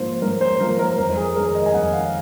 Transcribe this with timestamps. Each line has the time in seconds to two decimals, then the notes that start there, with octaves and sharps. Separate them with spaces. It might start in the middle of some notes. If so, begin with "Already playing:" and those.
Already playing: G#2 F3 A#3 C5
0.22 G#2 A#4
0.41 C5
0.60 F3 A#3 A#4
0.79 A#4
0.98 F2 A#4
1.10 A#4
1.17 G#4
1.36 D#3 G#3 A#4
1.55 D#5
1.66 G#5
1.73 F2 F#5
1.93 F5